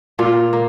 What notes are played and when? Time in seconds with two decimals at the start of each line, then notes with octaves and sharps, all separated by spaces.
0.19 A#2 F4
0.53 A#3